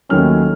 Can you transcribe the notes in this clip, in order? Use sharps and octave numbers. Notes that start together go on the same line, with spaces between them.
D#2 D#3 F#3 A3 C#4 F6